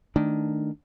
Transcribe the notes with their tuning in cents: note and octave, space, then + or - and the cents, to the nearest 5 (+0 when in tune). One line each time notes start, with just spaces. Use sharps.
D#3 +0 A3 +0 D4 +0